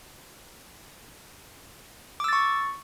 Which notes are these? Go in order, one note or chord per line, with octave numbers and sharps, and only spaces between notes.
C#6 D6 E6 A6